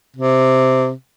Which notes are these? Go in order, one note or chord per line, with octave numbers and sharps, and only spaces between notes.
C3